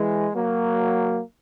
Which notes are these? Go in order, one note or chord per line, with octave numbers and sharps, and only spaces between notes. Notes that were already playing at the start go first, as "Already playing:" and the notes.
Already playing: E3 G#3
F#3 A#3